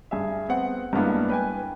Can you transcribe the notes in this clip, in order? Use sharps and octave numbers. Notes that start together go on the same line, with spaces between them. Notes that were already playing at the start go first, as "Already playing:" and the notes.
G2 G#4 E5
B3 C4 F#5
G2 G#3 A#3 B3 D4 E4
B4 G5 G#5